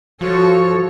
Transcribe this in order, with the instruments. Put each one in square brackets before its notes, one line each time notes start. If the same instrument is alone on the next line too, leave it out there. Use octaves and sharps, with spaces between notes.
[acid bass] F3 [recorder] F#4 [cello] A4 C#5